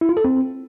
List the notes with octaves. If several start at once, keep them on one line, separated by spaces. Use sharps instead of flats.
E4
F4
A4
C4